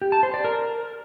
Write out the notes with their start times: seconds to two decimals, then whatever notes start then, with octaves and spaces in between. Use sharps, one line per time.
0.02 G4
0.12 A5
0.23 C5
0.34 D5
0.44 A#4